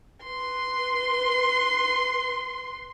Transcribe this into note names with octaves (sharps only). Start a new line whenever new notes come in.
B4 C6